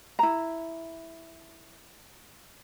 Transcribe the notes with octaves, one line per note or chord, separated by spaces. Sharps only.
E4 A#5